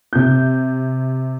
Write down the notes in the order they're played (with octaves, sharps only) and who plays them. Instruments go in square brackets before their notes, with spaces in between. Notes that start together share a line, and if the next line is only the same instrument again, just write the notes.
[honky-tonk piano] C3 G6